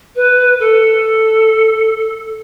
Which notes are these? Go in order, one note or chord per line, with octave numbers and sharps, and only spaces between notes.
B4
A4